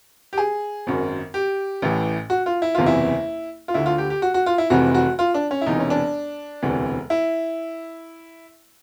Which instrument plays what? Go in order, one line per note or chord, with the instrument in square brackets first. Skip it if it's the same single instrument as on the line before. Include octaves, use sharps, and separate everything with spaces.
[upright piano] G4
G#4
G#1 F#2 D#3
G4
A1 A2 E3
F#4
F4
E4
F#1 E2 C3 E3 F4
E4
F4
D2 D3 E4
F4
G4
G4
F#4
F#4
F4
E4
F1 F2 C3 E3 F#4
F#4
F4
D4
C#4
E4
E1 E2 C3 E3 D#4
C#4
D4
E1 D2 C3 E3
E4